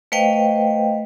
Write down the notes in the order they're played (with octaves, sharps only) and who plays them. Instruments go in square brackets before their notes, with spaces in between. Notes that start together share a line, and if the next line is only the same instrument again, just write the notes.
[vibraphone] A3 B4 C5 D#5 F5 G5